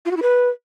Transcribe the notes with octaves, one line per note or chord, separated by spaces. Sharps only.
F4
F#4
E4
B4